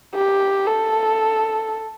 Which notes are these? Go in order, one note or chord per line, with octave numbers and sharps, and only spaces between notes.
G4
A4